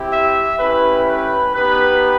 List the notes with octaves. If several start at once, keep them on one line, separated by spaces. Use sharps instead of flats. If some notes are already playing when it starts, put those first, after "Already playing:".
Already playing: C4 E4 G4
E5
A3 C#4 E4 G4 B4
B4
B3 D#4 G4 B4